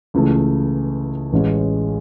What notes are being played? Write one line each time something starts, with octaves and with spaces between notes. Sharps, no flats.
C#2 C#3 E3 A3
A1 A2 G#3 C#4